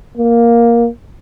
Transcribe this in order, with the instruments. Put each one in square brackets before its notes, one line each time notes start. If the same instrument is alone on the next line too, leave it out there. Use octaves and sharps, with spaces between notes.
[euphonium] A#3